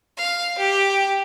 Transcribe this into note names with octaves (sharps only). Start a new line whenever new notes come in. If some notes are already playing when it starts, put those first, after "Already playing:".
F5
G4